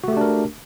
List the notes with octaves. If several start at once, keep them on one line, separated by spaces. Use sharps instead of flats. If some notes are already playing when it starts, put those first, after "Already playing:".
A3 D4 F#4 G4 A#4